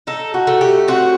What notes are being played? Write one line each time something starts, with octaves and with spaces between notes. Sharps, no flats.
D#4 A4
F#4
A3
G4
C4 F#4